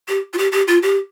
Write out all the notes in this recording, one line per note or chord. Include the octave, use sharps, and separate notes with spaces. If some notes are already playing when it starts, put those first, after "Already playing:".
G4
F4
G4
G4
F4
G4